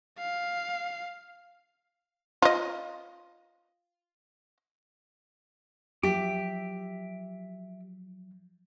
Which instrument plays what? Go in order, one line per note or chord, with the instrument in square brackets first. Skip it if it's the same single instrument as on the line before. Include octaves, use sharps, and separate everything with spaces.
[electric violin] F5
[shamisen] F4 D#5
[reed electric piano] F3 F#3 [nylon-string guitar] G4 [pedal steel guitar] E5 D6